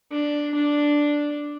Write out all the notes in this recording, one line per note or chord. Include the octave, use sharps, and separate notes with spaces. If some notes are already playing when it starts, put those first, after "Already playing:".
D4
D4